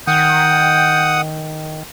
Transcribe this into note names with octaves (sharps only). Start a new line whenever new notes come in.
D#3 F#5 G5 D#6